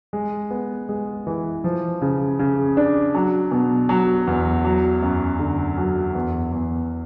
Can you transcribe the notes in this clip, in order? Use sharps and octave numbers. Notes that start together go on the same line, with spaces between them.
G#3
B3
G#3
E3
F3
C#3
C#3
D4
F#3
B2
F#3
E2
F#3
F#2
D3
F#3
E2
E2